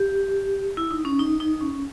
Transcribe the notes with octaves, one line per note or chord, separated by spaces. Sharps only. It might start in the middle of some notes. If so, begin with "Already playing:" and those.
Already playing: G4
E4
D#4
C#4
D#4
D#4
C#4